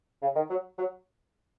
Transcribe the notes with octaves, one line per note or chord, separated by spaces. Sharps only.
C#3
D#3
F#3
F#3